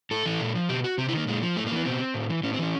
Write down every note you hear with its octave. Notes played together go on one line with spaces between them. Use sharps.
A2 A4
E3
A#2
F3
B2 G4
F#4
C3 C4
E4
D#3 A#3
A#2 G#3
F3
A2 A3
A#3
E3
B3
B2 C4
A2
E3
A2 C#4
C4
E3 C#4